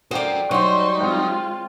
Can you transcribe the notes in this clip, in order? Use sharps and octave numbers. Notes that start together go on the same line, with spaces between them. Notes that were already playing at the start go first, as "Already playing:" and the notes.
F#4 A#4 C5 D5 F5 G5 D#6
F#3 G3 D#4 C5 C#5 C6
G#3 C4 F4 G5